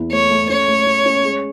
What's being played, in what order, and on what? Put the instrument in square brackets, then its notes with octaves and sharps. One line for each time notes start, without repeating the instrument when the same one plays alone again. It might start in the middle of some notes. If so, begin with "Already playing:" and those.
Already playing: [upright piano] E2 E4
[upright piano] A3 [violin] C#5
[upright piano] A3
[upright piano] C#4 [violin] C#5
[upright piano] A3
C#4
C#4
G#3